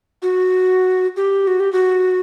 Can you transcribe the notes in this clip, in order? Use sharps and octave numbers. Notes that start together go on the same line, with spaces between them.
F#4
G4
F#4
G4
F#4